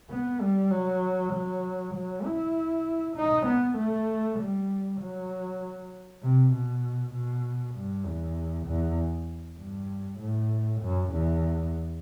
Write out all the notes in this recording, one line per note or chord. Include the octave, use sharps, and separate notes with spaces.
B3
G3
F#3
F#3
F#3
E4
D#4
B3
A3
G3
F#3
C3
B2
B2
G2
E2
E2
G2
A2
F#2
E2